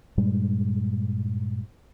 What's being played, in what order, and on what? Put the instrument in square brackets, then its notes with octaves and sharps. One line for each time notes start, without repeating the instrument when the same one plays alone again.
[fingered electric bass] G2 A#2 G3 G#3